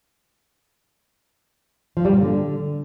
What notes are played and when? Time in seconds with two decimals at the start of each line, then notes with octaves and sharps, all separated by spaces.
1.97 F3
2.05 G3
2.13 A#2
2.21 D3